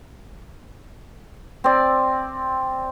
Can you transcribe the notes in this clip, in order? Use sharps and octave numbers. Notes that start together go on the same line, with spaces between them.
C4 D5